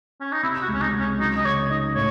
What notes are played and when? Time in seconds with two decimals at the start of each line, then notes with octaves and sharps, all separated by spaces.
0.21 C#4
0.32 D#4
0.43 C3 E4
0.62 F#4
0.68 C#2
0.74 C#4
0.81 D#4
0.94 C#2
1.00 C#4
1.19 F#3 D#4
1.37 D#5
1.44 C#3 C#5
1.70 D#4 D#5
1.95 A2 C#5